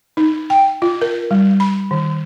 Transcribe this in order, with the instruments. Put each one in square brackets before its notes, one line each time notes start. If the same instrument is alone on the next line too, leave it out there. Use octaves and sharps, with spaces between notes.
[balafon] D#4
G5
F4
A#4
G3
B5
D#3